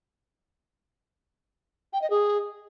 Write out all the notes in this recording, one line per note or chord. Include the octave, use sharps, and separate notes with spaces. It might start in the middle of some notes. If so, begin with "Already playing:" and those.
G5
D#5
G#4